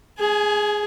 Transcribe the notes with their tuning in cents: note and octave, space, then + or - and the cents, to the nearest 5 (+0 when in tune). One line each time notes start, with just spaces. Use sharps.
G#4 +0 G#5 +35